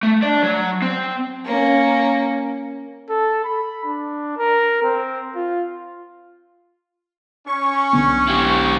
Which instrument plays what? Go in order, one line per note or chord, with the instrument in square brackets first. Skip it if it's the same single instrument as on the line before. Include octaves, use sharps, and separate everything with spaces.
[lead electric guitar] A3
D4 D5
F#3
C4
[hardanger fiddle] A#3 C#4
[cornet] A4
B5
D4
A#4
C4
F4
[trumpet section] C#4 [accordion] C#6
[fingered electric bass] B1 D3 B3
[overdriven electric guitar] E4 G4